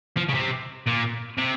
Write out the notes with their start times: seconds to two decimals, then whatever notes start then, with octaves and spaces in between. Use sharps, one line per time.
0.17 F3
0.29 C#3
0.34 C3
0.87 A#2
1.38 C3